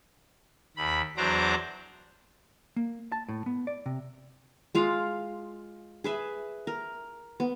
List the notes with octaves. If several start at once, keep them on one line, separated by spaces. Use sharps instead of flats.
D#2 B5
E2 F#3 D4 C5 A#5 D6
A#3
A5
A2
B3
D5
C3
G#3 F4 F5
G#4 B4 E5
A#4
B3